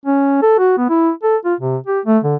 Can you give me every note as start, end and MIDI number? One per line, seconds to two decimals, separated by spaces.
0.06 0.40 61
0.42 0.55 69
0.58 0.73 66
0.78 0.86 59
0.89 1.11 64
1.23 1.36 69
1.45 1.54 65
1.60 1.76 48
1.86 2.00 67
2.06 2.18 57
2.24 2.36 50